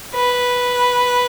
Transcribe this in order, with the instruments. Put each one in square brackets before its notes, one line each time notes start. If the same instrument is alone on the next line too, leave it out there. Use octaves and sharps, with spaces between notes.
[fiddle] B4